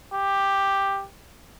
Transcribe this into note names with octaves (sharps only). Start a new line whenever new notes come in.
G4